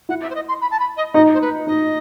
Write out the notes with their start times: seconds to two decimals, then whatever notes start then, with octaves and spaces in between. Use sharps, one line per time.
0.09 E4 F#5
0.22 E5
0.30 C5
0.35 D#5
0.48 C6
0.61 B5
0.71 A5
0.79 B5
0.97 D#5
1.14 D#4 D#5
1.34 C5
1.41 B4
1.67 D#4 D#5